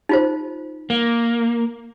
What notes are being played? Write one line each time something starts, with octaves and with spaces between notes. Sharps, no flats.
D#4 F4 C5
A#3